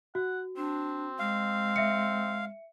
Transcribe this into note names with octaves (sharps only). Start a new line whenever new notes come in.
F#4 F#5
C4 D4
G#3 F5
E5 C#7